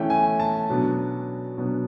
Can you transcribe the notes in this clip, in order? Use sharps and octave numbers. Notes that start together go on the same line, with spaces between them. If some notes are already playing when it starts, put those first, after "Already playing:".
Already playing: E3 A3 C#4 G5
G#5
A5
B2 F#3 B3 D4
B2 F#3 B3 D4